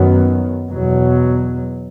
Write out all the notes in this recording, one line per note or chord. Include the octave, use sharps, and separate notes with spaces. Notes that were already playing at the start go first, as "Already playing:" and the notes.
Already playing: F#2 D#3 F#3 B3
E2 B2 F#3